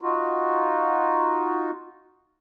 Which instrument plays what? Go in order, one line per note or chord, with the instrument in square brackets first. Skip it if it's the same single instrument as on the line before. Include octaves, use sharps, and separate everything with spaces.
[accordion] D#4 F4 F#4